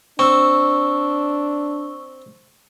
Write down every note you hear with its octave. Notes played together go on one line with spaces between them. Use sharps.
C4 D4 C#6 E6